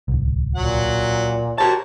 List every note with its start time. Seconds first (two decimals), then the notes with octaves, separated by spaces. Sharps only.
0.08 D1 C2
0.55 A#2 F#3 F#5
1.58 F#4 G4 A#4 C5 C#5 A5